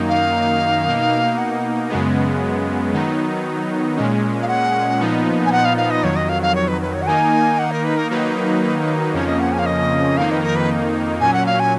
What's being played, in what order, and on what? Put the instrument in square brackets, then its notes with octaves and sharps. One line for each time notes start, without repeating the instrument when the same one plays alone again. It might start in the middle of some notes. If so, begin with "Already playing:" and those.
Already playing: [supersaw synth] F#2 D#3 A#3 D#4
[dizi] F5
[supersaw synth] B2 A#3 D#4
[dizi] F#5
[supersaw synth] F#2 C#3 G#3 B3
D#3 F#3 B3 D#4
A#2 G#3 C#4
[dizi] F5
F#5
[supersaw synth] A#2 F3 B3 D#4
[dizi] G#5
F#5
F5
F5
D#5
[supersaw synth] F2 D#3 F#3 [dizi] C#5
[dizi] D#5
F5
F5
C#5
B4
B4
C#5
F#5
[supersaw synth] D#3 A#3 D#4 [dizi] G#5
[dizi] F#5
A#4
B4
A#4
[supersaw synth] D#3 F#3 A#3 D#4 [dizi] B4
[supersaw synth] F2 C#3 F3 A#3 C#4 [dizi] C#5
[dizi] D#5
F#5
G#5
F5
D#5
[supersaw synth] F2 D#3 A#3 D#4 [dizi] F5
[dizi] B4
A#4
B4
[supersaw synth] A#2 F#3 C#4 [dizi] G#5
[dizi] F#5
F5
G#5